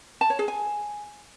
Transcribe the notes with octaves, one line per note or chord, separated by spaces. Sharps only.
A5
C#5
G#4
G#5